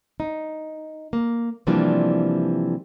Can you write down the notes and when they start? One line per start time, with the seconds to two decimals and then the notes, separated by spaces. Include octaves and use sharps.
0.20 D#4
1.13 A#3
1.67 C3 E3 F3 G3 A#3 D4